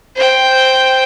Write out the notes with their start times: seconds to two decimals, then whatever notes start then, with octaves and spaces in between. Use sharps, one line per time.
0.16 C5 G5